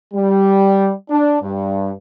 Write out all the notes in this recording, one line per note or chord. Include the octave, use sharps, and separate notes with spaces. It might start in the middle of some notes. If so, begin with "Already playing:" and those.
G3
D4
G2